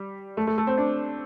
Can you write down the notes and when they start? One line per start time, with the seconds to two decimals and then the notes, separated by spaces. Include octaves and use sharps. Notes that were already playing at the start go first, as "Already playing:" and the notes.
Already playing: G3
0.37 A3
0.47 A3
0.58 A3
0.67 C4
0.78 D4